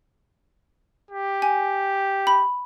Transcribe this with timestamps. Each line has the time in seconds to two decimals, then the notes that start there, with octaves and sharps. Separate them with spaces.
1.11 G4
1.42 G#5
2.27 B5